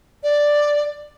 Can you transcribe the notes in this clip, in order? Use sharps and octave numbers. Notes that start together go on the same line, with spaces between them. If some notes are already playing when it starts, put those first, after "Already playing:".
D5